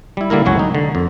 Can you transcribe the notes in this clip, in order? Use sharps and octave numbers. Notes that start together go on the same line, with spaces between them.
G3 E4
D3 G3 A#3 E4 A#4
G1 C#2 F#3 F#4 G#5
D#4
D3
F2